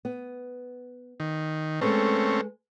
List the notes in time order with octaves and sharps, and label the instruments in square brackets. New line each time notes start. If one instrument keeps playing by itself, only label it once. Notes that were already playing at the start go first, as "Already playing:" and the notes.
[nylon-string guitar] B3
[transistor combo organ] D#3
[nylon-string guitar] G#3 A4 B4 [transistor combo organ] A3 C4 C#4